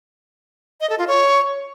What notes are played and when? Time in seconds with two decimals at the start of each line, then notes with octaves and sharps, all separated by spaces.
0.81 D#5
0.90 A4
0.98 F4
1.07 C#5